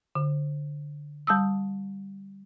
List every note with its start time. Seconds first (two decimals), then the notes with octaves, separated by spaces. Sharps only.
0.15 D3
1.27 G3 A5 D#6 E6